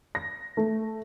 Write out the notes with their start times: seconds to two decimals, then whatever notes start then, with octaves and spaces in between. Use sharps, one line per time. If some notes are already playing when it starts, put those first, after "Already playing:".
0.15 A#6
0.57 A3